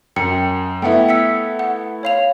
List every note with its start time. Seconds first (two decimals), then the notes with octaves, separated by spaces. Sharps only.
0.16 F#2 G5 C#7
0.82 A3 B3 E4 E5 F#5 G5
1.09 E6 B6 C#7
1.59 F#5
2.03 C#5 F5 F7